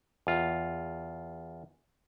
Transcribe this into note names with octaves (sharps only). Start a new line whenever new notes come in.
E2 F4